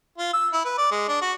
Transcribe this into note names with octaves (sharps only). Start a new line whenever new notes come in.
F4
E6
E4
B4
D5
G#3
D4
F#4